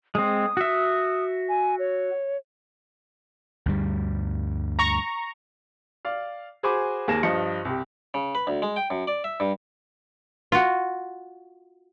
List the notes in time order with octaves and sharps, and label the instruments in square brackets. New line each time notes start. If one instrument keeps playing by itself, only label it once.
[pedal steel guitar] G#3 C4 [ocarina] D#6
[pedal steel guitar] F#4 E5
[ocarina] G#5
C#5
[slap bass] D2 G2 G3
[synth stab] A#5 C#6
[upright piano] D5 F5
F#4 G#4 C5 G#5 B5 D6
D#2 A#3 G#4 A#6 E7
G2 F3 D#5 C#7
C2 G4
[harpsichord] C#3
B4
D2
G#3
G5
F#2
D5
E5
G2
[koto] F4 F#4